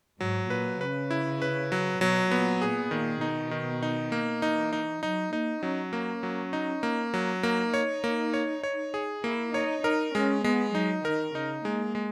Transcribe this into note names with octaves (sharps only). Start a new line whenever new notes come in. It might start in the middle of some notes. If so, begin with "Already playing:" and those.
G#2 F#3
A#2 B4
C#3 B4
E4
B4
F#3
B2 F#3
A#2 B3
A#2 G#4
A#2 D#3
B2 D#4
D#3
D#4
A#3
E3 D#4
D#4
F#3 D#4
A#3 D#4
F#3 C#4
A#3 C#4
F#3
D#4
A#3
F#3
A#3 D#4
C#5
A#3
C#5
C#5
G#4
A#3 E4
D#4 C#5
D#4 A#4
G#3 C#4
G#3 B3
F#3 D#4
D#3 A#4
C#3 D#4
G#3 A#3
G#3